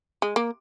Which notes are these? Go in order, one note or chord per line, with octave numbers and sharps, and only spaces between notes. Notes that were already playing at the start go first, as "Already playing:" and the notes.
G#3
A#3